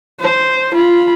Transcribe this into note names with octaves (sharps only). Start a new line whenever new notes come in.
C5
F4 B5